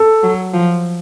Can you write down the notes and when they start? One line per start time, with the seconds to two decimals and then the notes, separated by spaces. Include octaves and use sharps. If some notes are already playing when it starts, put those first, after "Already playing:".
Already playing: A4
0.23 F#3
0.54 F3